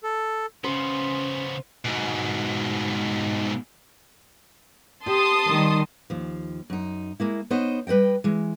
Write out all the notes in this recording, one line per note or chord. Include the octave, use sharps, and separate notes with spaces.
A4
C#3 B3 C#4 C5
G#2 B2
G4 A5 C6 D#6
D#3 G3
D#2 F3
F#2 D#4
G#3 A#3 E4
B3 D#4 C5 C#5 D#5
G3 B4 C5 D#5 G5
E3 G#3